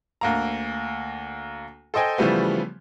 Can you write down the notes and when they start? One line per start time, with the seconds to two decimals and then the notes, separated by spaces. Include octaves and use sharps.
0.21 D2 A#3 A#5
1.94 A4 C5 D#5 G5 G#5
2.18 C#3 E3 F3 G3 A3 B3